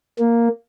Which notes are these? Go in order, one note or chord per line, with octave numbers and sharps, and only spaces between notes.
A#3